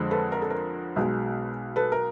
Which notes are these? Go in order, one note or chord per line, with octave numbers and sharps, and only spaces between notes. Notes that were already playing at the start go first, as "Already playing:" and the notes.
Already playing: F2 D3 F3 G#3
A4 B4
A#4
A4
A#4
B1 B2 G#3
A4 B4
A#4